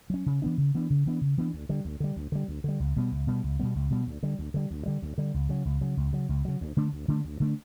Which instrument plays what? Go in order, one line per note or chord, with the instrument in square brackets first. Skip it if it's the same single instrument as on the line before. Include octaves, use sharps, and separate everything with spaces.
[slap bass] F#3 C#4
C#3
E3 B3 D4
C#3
E3 B3 D4
C#3
E3 B3 D4
C#3
E3 B3 D4
D2
D3 G3
D2
D3 G3
D2
D3 G3
D2
D3 G3
C#2
B2 G3 B3
C#2
B2 G3 B3
C#2
B2 G3 B3
C#2
B2 G3 B3
D2
D3 G3
D2
D3 G3
D2
D3 G3
D2
D3 G3
C#2
C#3 F#3
C#2
C#3 F#3
C#2
C#3 F#3
C#2
C#3 F#3
D2
D3 A3 D4
D2
D3 A3 D4
D2
D3 A3 D4